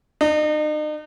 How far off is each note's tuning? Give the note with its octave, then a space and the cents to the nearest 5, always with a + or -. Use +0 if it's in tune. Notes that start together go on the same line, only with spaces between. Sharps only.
D#4 -40